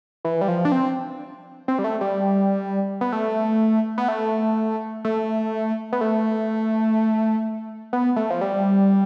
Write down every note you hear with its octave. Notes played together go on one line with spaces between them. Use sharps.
E3
G3
F3
D4
C4
C4
G3
A3
G3
B3
A3
B3
A3
A3
B3
A3
B3
A3
F3
G3